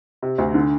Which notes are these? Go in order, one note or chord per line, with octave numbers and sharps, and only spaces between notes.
C3
D2
D3